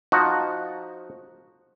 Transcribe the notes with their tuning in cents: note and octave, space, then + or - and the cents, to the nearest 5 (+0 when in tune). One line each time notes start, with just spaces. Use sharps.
F3 +10 D#4 +0 F#4 +0